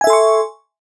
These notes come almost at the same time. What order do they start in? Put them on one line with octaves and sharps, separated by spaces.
G#5 E5 A4 C6 C#6